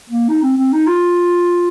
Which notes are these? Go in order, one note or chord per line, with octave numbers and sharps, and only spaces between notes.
A#3
D#4
C4
C4
D#4
F4